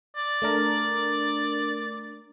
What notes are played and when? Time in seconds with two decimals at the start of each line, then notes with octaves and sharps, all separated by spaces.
0.16 D5
0.42 A3 D4 A#4